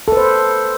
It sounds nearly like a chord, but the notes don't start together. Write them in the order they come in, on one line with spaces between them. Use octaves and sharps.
A4 B4 C5